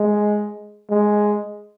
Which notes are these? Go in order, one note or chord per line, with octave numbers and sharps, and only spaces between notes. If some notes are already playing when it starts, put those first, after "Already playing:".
Already playing: G#3
G#3